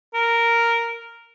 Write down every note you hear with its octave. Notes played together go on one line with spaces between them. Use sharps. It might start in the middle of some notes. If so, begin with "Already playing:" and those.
A#4